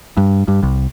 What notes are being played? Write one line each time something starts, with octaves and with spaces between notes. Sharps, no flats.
G2
G2
C2